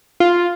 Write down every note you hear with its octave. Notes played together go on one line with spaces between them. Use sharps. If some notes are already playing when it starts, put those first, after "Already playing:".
F4